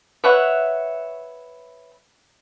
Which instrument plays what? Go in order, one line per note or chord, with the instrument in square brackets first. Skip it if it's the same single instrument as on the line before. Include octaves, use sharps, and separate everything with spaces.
[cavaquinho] B4 C#5 E5 F#5